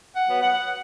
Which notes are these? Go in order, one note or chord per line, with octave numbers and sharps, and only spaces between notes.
F#5
F#3 B3
F#5